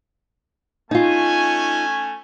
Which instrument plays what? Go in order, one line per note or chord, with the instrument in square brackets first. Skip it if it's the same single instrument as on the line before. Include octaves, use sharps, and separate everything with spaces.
[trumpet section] A3 C#4 G#5 [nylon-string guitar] D#4 F4